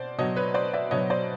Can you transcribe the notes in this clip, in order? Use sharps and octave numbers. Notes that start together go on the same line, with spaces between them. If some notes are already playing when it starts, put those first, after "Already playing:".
Already playing: B2 C5 D5
B2 F#3 C#5 D#5
B4 C#5
C5 D5
D5 E5
B2 F#3 C#5 D#5
C5 D5